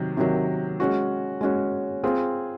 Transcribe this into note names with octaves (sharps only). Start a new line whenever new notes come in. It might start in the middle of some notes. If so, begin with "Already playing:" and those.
Already playing: C3 D#3 F#3
C3 D#3 F#3
G#3 C#4 F#4
G#3 C#4 F#4
C4 F4 G#4